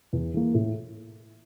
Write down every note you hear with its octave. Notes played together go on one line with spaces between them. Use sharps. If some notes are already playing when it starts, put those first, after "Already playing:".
E2
E3 A#3
A2